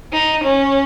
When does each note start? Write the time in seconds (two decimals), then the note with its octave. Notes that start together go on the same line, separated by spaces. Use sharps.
0.13 D#4
0.43 C#4